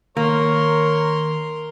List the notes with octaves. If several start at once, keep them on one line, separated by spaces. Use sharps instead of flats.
D#3 A#3 A#4 C#5 C6